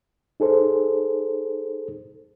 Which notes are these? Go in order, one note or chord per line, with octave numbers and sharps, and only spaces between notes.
D#4 G#4 A4 C5